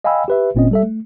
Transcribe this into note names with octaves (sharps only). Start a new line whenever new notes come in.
D#5 F5 G5 G#5 B5 E6
G4 B4 E5
G1 A#2 C4 C#4 D#5
G3 A4 E5
A3